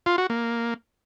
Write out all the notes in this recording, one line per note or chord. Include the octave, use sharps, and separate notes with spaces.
F4
F#4
A#3